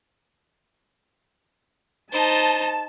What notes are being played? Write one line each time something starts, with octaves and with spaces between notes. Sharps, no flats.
D#4 C5 A5